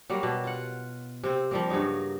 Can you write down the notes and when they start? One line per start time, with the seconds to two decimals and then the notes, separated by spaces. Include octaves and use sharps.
0.10 F#3 G3 A#3
0.23 B2
0.44 F4 F#5
1.23 C3 C4
1.51 F3 G3 A#3
1.70 G2 C#3 F#3 D#4